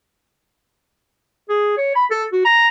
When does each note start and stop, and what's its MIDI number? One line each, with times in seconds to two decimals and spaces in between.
1.49 1.75 68
1.78 1.94 73
1.95 2.05 83
2.11 2.24 69
2.32 2.41 66
2.45 2.68 82